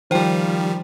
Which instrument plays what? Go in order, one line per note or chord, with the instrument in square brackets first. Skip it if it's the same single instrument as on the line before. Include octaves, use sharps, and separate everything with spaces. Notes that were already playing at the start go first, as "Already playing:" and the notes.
[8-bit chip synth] D#3 G3 [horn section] F3 [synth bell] C5 G5